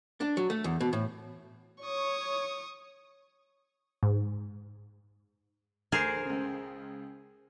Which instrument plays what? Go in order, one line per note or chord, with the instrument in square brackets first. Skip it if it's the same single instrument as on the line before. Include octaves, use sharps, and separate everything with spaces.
[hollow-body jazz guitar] D4
F#3
A3
E2
B2
A2
[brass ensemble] C#5 [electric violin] C#6 D#6
[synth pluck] G#2
[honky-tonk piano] D2 [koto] G#4 A#4 C5
[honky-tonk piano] C#2 C#3